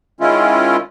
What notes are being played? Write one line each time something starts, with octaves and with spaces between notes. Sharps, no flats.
D#3 G#3 C#4 E4 F4